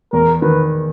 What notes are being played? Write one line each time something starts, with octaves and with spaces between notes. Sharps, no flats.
E2 A#4
D#3 B4